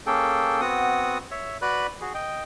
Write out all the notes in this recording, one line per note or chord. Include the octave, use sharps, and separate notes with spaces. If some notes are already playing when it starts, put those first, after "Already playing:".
A#3 C#4 G#4 A4 G5
B3 C4 F#4 F#5 D#6
C#5 E5
F#4 B4 D5 B5 F#6
F#4 G#4
D#5 G5